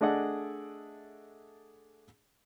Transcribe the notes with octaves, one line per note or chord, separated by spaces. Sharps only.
A3 D4 G#4 D5 D#5 F#5